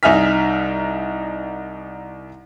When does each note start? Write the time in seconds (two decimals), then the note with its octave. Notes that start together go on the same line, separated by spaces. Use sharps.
0.03 C2 D#4 E5 G#5 F6 B6